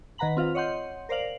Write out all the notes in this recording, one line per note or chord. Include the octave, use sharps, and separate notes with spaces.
D#3 B4 F#5 A#5 B5 F#7
C4 F4 F5
C#5 D#5 F#5 C6 G6
A#4 C5 D5 F5 F#7